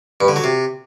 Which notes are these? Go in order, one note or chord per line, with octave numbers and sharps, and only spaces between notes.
G2
D3
F#3
C3